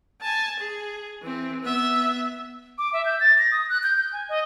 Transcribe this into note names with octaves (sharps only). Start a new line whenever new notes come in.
G#5 A5
G#4
E3 C4
B3 E5
D6
E5
G6
A6
A#6
D#6
F#6
G6
G6
G#5
D#5